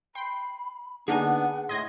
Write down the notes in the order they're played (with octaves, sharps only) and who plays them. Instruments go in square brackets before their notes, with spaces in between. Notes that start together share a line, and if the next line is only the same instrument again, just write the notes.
[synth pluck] G5 C6 [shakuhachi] B5
[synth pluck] D3 A#3 D#4 [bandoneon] B3 D4 [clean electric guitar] G#4 G#5 [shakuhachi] F#5
[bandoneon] A2 C6 [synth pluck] D#5 G#6 A#6